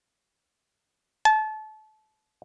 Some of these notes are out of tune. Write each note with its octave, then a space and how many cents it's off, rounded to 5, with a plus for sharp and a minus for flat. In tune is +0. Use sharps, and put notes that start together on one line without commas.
A5 -30